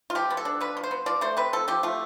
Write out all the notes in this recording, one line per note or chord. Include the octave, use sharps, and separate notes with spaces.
F4
F3 G4
B3
A4
D4
F3 B4
F3
C5
B3
F3 D5
A3 C5
C4 B4
F3 A4
F3 G4
A3 F4